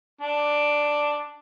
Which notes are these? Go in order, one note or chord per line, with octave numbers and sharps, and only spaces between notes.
D4